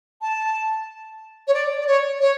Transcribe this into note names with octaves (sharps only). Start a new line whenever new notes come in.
A5
C#5
D5
D5
C#5
C#5